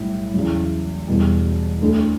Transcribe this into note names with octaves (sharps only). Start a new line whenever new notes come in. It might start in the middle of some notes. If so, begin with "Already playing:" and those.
Already playing: B1 A2 G3
E2 C#3 F#3
E1 E2 B2 G3
D2 D3 A3